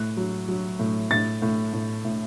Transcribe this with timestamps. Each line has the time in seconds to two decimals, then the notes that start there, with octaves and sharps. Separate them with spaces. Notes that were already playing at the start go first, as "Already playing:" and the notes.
Already playing: A2 F#6
0.17 F#3
0.48 F#3
0.79 A2
1.11 A2 A6
1.42 A2
1.73 A2
2.05 A2